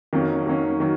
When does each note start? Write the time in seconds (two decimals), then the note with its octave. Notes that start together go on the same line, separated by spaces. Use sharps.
0.13 F2 D#3 F#3 A#3 C#4
0.45 F2 D#3 F#3 A#3 C#4
0.80 D#3 F#3